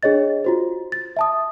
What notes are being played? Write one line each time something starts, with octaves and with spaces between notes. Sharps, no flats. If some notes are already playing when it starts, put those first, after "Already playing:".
D4 G#4 C#5 D#5 A6
F4 F#4 C5
A6
E5 A5 D#6